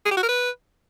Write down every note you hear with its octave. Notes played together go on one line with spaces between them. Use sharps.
G#4
G4
F#4
A#4
B4